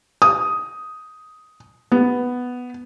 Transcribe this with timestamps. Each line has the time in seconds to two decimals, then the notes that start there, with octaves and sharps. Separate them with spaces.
0.22 D#6
1.92 B3